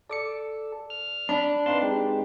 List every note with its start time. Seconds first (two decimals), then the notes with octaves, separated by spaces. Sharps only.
0.10 A4 D5 D6 C#7
0.90 F6
1.29 D4 B5
1.66 C4 D#4 B4 F5 A5 C6
1.82 G#3 G4